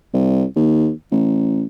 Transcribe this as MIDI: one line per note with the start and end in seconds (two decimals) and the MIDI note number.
0.13 0.45 36
0.56 0.91 39
1.11 1.65 33